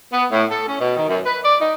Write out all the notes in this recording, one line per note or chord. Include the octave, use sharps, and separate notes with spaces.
B3
A2
A4
C#4
B2
D#3
F#2
B4
D5
D#4